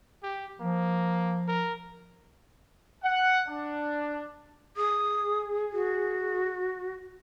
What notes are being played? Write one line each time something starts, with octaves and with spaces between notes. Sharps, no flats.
G4
F3 A#3
A#4
F#5
D4
G#4 D#6
F#4